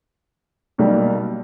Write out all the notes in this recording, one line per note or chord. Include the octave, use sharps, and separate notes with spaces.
B1 B2 G3 A#3